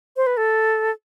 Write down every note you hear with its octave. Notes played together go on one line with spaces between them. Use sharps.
C5
B4
A4